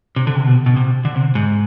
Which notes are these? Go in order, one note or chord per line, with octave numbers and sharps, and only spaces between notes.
C3
D3
C3
B2
B2
C3
D3
C3
G#2